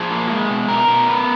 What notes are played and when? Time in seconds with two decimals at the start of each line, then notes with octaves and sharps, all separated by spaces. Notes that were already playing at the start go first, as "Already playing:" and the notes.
Already playing: F3 G#4
0.11 A#3
0.30 G#3
0.50 B2
0.68 B2 A#4
0.88 B2
1.08 B3